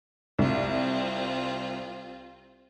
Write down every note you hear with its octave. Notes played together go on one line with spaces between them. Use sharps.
C2 C4 F4